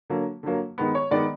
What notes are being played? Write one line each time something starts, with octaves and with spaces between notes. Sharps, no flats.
D3 F#3 A#3
D3 F#3 A#3
D#3 G#3 B3
C#5
D#3 G#3 B3 D5